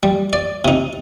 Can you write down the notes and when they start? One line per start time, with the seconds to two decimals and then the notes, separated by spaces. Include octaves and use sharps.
0.03 G3
0.33 D5
0.65 C3 D#4